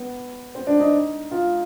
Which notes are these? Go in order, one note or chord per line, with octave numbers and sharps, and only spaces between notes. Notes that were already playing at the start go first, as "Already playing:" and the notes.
Already playing: B3
C4
D4
D#4
F4